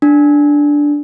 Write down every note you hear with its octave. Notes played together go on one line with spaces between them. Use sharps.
D4